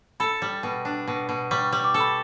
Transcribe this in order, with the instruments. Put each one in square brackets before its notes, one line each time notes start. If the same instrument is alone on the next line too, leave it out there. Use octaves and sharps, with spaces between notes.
[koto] A4 [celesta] B5
[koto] G3
B2
D4
B2
B2
[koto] G3 [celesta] C#6
[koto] G3
[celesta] D6
[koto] A4
[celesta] B5